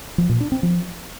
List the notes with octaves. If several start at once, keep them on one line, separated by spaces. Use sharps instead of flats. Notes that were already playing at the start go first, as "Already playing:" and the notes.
F3
A#2
D4
C4
F3